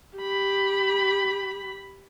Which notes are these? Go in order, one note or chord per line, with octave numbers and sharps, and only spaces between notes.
G4 B5